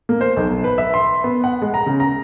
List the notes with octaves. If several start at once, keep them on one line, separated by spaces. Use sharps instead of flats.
A#3
C5
B1
B4
E5
C6
B3
F#5
G#3
A#5
C#3
A#5